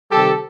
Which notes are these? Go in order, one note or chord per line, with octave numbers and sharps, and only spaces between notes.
C3 D#3 G3 G4 A4